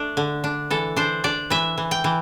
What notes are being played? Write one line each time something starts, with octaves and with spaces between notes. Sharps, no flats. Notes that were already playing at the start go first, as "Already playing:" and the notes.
Already playing: A3 D4
D3
D4
E3 A4
D4 C5
D4 D5
E3 E5
E3
G5
E3